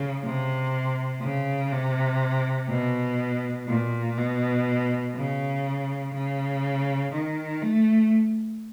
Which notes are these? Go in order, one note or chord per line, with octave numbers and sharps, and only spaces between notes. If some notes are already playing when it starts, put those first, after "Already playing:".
Already playing: C#3
C3
C#3
C3
B2
A#2
B2
C#3
C#3
D#3
A3